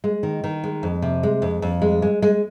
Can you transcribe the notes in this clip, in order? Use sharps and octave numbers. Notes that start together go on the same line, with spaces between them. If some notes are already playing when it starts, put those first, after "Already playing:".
G#3
D#3
D#3
G#3
F2
C3
G#3
F2
F2
G#3
G#3
G#3